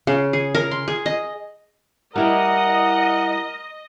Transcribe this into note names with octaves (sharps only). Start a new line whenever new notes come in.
C#3
G#4
A#4
C6
G#4
D#5
G3 E4 G4 A#4 D#5 F#5